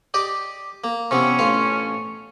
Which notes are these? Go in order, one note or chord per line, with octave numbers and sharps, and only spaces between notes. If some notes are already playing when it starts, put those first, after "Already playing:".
G4 D5 D#5
A#3
C3 E3 B3 C#4
A1 F4 F5